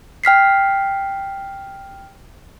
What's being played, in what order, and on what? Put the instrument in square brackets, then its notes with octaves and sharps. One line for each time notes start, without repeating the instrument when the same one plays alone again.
[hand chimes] G5 F6 B6 C7